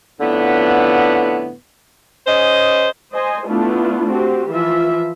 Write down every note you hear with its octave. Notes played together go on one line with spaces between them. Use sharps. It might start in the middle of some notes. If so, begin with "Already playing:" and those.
F2 A2 D3 B3
C#4 G#4 C5 D#5
C5 D#5 G#5
A3 B3 D4 E4 F4
C4 F#4 G4
E3 F3 F4 E5